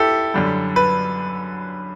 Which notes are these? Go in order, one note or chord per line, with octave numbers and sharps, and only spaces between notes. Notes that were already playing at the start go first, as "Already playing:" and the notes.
Already playing: E4 G4 A4
F#2 D3 G3
B4